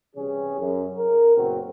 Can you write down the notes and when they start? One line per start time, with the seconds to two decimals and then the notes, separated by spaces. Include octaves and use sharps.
0.16 C3 E3 G3 C#4 G#4
0.59 F#2
0.97 A#4
1.36 F#1 A#2 B3 C4 F#4